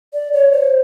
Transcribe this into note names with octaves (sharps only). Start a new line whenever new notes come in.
D5
C#5
C5